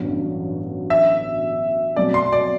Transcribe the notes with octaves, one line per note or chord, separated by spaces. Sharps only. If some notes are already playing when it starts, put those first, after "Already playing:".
Already playing: A1 G2 D3 F#3 B3
E5
B2 F#3 A3 C4 D5
C6
D5